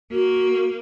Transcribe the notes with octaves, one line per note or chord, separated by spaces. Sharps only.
A#3 F#4